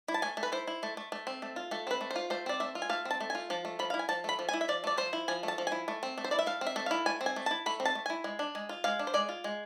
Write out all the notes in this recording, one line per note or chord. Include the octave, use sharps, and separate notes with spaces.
E4
A5
A3 G#5
A3
B4
E4 C5
E4
A3
A3
A3
C4
A3
F4
A3 A4
C4 B4
A3
C5
F4
A3 C5
C4 D5
A3 E5
F4
G#5
A3 F5
C4
A5
A3
F4 G#5
F3 A5
A3
F3 B5
E4 F5
G#5
F3 A5
A3 B5
F3
E4 G#5
E5
F3 D5
A3 D5
F3 C5
E4
F3 G#5
A3
A5
F3
E4 G#5
A3
C4
A3
C5
E4 D5
E5
A3 F5
C4
E5
A3
E4 F5
A3 G#5
C4
G#5
A3
E4 A5
A3 B5
C4
A5
A3
E4 G#5
G#3
D4
G#3
F4
G#3 F5
D4
C5
G#3 D5
F4
G#3